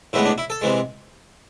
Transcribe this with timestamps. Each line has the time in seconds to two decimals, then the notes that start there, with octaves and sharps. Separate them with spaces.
0.13 A2 E3 G#3 B3 E4
0.25 D4
0.38 E4
0.50 A4
0.62 C3 E3 G#3